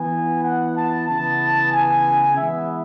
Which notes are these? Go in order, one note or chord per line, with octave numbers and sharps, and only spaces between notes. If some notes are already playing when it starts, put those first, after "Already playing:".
Already playing: E3 B3 G#5
F#5
A5
C#3 E3 B3 A5
G#5
E3 G#3 B3 E5